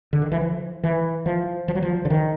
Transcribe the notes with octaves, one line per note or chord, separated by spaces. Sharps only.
D3
D#3
E3
F3
E3
F3
F3
F#3
F3
D3
D#3